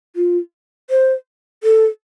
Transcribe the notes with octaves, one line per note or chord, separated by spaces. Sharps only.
F4
C5
A4